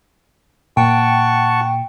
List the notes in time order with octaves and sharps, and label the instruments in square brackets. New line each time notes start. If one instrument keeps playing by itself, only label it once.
[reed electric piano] A#2 [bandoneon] F#5 A5 C#6 [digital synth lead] G5